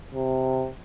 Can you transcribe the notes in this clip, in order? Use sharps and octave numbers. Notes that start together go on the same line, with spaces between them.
C3